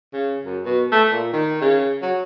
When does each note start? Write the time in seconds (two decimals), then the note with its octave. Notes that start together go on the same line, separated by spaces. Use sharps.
0.13 C#3
0.45 F#2
0.65 B2
0.92 A3
1.12 A#2
1.33 D#3
1.61 C#3
2.02 F#3